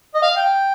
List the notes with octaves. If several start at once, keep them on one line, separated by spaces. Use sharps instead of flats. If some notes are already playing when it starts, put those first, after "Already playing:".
D#5
F5
G5